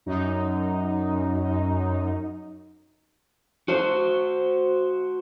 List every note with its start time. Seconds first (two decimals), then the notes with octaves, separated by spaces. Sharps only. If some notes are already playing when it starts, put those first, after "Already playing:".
0.06 F#2 D#4
3.68 F#4 C5